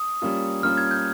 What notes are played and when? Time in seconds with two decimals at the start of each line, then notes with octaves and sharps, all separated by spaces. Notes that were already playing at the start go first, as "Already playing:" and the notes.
Already playing: D#6
0.22 G3 A#3 C#4 F4
0.63 G3 A#3 C#4 F4 F6
0.77 G#6
0.91 G6